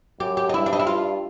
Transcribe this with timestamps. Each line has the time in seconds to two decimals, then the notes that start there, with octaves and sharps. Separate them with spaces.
0.20 F#2 G4
0.37 G4
0.49 D#4
0.54 G2 E4
0.66 D4
0.73 D#4
0.79 E4
0.87 G2 F4